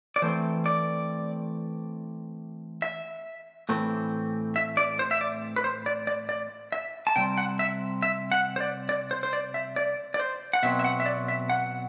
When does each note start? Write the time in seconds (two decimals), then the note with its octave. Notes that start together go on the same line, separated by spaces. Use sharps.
0.16 D5
0.22 E3 A3 C4 C5
0.66 D5
2.82 E5
3.69 A2 E3 A3 C4
4.56 E5
4.77 D5
4.99 C5
5.11 E5
5.21 D5
5.56 B4
5.64 C5
5.86 D5
6.07 D5
6.29 D5
6.72 E5
7.07 A5
7.16 C3 G3 C4 G5
7.38 F#5
7.59 E5
8.02 E5
8.32 F#5
8.56 C5
8.60 D5
8.89 D5
9.11 C5
9.23 C5
9.33 D5
9.54 E5
9.76 D5
10.14 D5
10.19 C5
10.53 F#5
10.63 B2 F#3 C4 E5
10.79 E5
10.84 F#5
11.00 E5
11.06 D5
11.28 E5
11.49 F#5